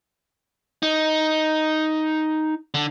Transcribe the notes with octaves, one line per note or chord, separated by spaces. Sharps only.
D#4
D3